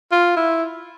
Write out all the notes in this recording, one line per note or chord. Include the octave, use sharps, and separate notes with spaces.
F4
E4